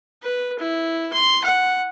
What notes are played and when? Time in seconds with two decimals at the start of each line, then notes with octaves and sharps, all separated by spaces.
0.23 B4
0.59 E4
1.13 C6
1.44 F#5